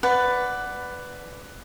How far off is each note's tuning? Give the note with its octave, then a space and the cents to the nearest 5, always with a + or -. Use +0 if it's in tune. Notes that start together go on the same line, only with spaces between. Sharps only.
B4 +10 D5 +0 F#5 +0